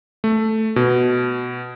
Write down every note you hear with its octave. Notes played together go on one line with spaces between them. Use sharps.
A3
B2